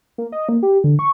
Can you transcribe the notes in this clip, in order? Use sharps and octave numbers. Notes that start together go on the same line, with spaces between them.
A#3
D#5
A#3
G4
D3
C#6